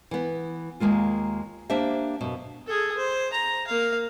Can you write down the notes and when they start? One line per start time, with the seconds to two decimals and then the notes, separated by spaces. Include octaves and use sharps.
0.11 E3 B3
0.80 D#2 G#3 A#3 F4
1.70 A#3 D4 G4 C5 E5
2.21 F#2 B2
2.67 G#4 A4
2.98 C5
3.33 A#5
3.67 A#3 F5